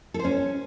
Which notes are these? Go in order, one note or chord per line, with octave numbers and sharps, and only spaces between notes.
A4
C5
C#4